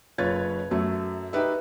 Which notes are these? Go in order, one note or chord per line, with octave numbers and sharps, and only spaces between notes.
F#1 F4 B4 C#5 G#6 A6
F#2 F#3 A3
D#4 G4 B4 E5